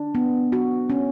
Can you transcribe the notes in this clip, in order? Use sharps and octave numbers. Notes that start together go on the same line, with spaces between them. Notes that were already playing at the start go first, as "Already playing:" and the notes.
Already playing: D4
B3
F#4
C#4